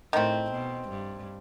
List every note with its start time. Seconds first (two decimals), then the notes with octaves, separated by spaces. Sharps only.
0.13 A2 D#3 A3 C4
0.51 B2
0.89 G2